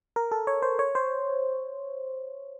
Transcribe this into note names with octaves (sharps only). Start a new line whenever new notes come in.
A#4
A4
C#5
C5
C#5
C5